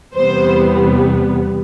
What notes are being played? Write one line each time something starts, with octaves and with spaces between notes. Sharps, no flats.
E2 C3 G3 B3 C5